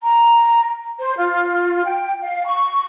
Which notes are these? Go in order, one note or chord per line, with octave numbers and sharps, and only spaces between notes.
A#5
C5
F4
G5
F5
C#6